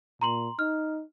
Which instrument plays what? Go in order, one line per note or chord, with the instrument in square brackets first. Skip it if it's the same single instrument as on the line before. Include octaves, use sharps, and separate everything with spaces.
[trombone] A#2 [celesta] A#5 C6 F#7
[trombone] D#4 [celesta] F6